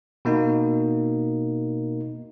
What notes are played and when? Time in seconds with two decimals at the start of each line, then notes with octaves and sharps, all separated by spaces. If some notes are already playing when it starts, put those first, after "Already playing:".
0.25 B2 A#3 D#4